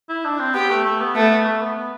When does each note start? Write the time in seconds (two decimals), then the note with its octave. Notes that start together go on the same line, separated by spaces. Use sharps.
0.09 E4
0.25 D4
0.39 C4
0.55 B3 G4
0.70 A3
0.85 A3
1.01 B3
1.15 A3 B3
1.30 B3
1.46 A3
1.61 B3
1.76 B3